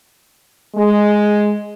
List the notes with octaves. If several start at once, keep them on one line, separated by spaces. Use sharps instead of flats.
G#3